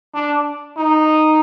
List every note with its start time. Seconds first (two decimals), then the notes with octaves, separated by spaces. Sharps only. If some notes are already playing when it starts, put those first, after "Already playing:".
0.14 D4
0.77 D#4